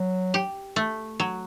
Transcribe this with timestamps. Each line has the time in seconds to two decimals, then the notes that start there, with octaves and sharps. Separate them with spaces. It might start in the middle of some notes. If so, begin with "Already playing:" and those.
Already playing: F#3
0.34 G4
0.76 A3
1.20 F#3